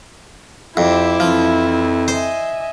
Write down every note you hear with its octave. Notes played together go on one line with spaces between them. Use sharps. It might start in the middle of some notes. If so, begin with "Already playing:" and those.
F2 E4 G4 C5 D6
F2 E3 F3
C5 D#5 E5 G#5